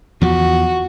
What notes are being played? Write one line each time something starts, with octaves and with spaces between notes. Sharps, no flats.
E2 F3 F#4